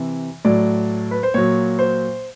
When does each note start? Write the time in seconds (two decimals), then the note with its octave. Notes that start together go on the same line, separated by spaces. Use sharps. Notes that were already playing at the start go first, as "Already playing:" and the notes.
Already playing: C3 E3
0.45 A2 F#3 D5
1.11 B4
1.23 C5
1.34 A#2 F#3 C#5
1.79 C5